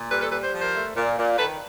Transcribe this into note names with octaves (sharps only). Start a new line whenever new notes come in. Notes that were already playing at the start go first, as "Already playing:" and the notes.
Already playing: A#2
G3 A4 B4
A#4
A4 B4
G3 A4 B4
C5
F3
A#4 C5
A3
A#2
A#2
D#3 A4 B4